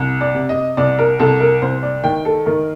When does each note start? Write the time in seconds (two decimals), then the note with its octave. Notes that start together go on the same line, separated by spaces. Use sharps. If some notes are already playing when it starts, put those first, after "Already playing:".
Already playing: C2
0.21 D5
0.35 C3
0.49 D#5
0.77 C2 D5
0.99 A#4
1.19 C2 A4
1.40 A#4
1.62 C2 C5
1.83 D5
2.04 D#3 G5
2.25 A4
2.46 D#3 A#4